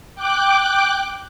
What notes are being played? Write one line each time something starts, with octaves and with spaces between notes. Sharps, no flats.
G5 D6 F#6